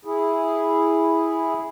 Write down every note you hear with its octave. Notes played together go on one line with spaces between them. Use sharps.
E4 G#4